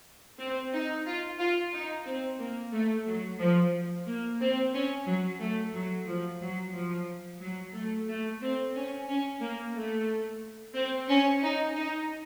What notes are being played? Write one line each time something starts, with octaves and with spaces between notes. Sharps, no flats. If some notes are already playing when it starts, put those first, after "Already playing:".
C4
D#4
F4
F4
D#4
C4
A#3
A3
F#3
F3
A#3
C4
C#4
F#3
A3
F#3
F3
F#3
F3
F#3
A3
A3
C4
C#4
C#4
A#3
A3
C4
C#4
D#4
D#4